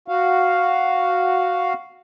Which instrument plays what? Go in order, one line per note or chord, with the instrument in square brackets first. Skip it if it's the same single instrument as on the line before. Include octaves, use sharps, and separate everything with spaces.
[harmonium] F#4 F5